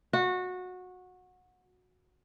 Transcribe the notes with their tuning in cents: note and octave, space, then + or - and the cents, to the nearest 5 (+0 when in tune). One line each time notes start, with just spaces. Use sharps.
F#4 -20